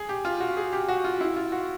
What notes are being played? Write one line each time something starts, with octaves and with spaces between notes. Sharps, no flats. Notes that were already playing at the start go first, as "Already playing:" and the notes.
Already playing: G#4
G4
F4
F#4
G#4
G4
F#4
F4
E4
F4
F#4